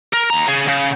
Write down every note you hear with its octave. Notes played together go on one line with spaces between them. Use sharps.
A#4
D#2 A#5
C#3 G#4
C#3